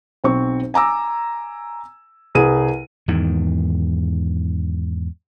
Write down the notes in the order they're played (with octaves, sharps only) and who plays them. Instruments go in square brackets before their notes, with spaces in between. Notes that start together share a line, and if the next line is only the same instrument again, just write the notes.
[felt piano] B1 C4 C#6
G#5 A#5 D6 E6
C2 G#4 B4 D#7
[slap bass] E2 G#2 D#3